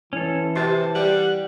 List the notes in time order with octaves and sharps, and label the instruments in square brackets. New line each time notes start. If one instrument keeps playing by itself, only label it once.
[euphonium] E3 [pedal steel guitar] C#4 A4
[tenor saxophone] C3 [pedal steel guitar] C5 A5
[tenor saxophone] G3 [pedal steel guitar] F#5